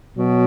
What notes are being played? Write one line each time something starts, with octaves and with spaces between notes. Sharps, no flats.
B2 F#3